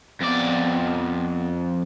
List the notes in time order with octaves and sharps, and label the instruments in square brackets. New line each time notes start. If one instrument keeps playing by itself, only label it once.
[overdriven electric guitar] F2 D5 [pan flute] B3